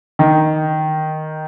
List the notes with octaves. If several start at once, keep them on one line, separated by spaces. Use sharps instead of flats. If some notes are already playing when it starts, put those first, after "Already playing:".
D#3